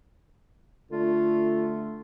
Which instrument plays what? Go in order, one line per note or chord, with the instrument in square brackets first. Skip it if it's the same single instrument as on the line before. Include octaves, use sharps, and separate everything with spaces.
[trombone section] D3 A3 [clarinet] F4